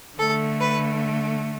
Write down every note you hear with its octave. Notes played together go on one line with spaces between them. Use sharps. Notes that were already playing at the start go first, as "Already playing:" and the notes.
D3 A3 A4
B4